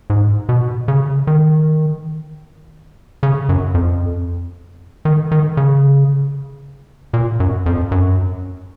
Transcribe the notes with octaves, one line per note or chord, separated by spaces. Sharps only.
G#2
B2
C#3
D#3
C#3
F#2
F2
D#3
D#3
C#3
A#2
F#2
F2
F#2